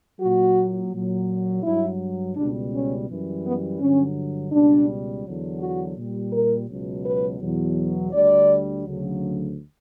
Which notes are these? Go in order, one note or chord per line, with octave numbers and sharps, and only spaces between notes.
A#2 F#3 F#4
A#2 F#3
G2 F#3 E4
C#2 B2 G3 D4
C#4
F#2 E3 G3
B3
G2 D3 F#3 C#4
C#2 B2 G3 D4
E2 D3 F#3
F#4
A#2
G3
A#4
C#2 B2 F#3
B4
E2 B2 F#3
D2 D3 G3 D5
D2 C#3 F#3